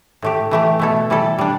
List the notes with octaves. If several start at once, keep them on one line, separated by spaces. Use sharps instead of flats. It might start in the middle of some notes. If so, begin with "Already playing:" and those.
A2 A3 G4
E3 A3 G4
B2 A3 E4 A4
E3 G3 E4 A4
G3 D4